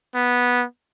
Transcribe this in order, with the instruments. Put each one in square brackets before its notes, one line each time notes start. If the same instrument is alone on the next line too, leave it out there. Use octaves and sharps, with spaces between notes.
[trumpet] B3